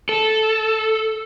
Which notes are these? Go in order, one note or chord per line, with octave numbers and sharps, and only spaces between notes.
A4